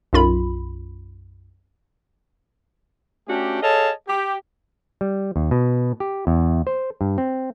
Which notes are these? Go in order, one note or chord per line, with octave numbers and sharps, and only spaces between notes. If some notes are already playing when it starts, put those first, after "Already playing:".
B1 F#2 F4 B5
A3 C#4 D4 F#4 G4
G#4 A4 C#5 D#5 F5 A5
G4
G3
D#2
B2
G4
E2
C5
G2
C4